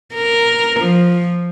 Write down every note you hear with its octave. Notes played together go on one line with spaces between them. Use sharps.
A#4
F3